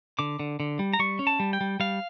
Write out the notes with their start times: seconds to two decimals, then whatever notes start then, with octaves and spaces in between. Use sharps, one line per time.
0.19 D3 D6
0.39 D3
0.60 D3
0.79 G3
0.93 A#5
0.99 G3 C#6
1.19 C#4
1.27 A5
1.40 G3
1.53 G5
1.61 G3
1.80 G3 F5